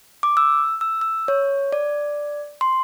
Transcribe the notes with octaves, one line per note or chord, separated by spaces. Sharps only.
D6
E6
E6
E6
C#5
D5
C6